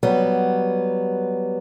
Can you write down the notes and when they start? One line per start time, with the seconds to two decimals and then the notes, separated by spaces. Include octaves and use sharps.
0.03 F#3 G3 B3